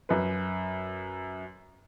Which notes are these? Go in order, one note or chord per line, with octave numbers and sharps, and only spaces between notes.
F#2 B4